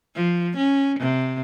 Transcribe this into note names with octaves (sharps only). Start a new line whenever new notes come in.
F3
C#4
C3